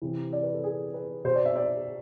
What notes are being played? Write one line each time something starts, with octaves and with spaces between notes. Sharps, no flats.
C3 E3
D5
B4
A4
G#4
B4
B2 C5
D5
E5
D5